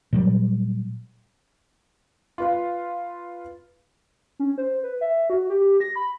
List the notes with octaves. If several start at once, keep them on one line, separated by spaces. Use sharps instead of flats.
A#2 F#3 G3
F4 B4 F5
C#4
C5
B4
E5
F#4
G4
A#6
B5